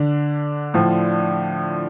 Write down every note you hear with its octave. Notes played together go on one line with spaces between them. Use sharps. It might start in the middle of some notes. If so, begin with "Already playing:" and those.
Already playing: D3 D4
A2 F3